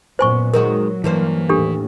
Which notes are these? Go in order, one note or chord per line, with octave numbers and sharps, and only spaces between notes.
F#2 A#2 B3 C5 G#5 C#6
D#3 F#3 G#3 F#4 A#4
G2 E3 A#3 C5
D#2 A2 D4 G4 A4